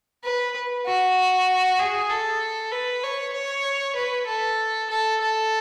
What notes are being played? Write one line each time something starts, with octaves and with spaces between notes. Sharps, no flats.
B4
F#4
G#4
A4
B4
C#5
C#5
B4
A4
A4
A4